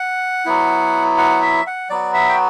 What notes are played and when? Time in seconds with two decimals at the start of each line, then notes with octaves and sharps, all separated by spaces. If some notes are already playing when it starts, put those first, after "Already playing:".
Already playing: F#5
0.45 F#3 B3 E4
1.18 F#5
1.42 E5
1.67 F#5
1.90 F#3 B3 F#4 D5
2.14 E5
2.29 G5